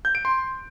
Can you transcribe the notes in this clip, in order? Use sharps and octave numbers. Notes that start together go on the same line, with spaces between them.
G6
D7
C6